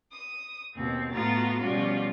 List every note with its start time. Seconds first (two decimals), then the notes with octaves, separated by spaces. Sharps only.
0.11 D#6
0.76 D#2 B2 C4
1.11 A2 B3 F4 F#4 A#5 A6
1.58 B2 F3 G3 C#4 F4 F#4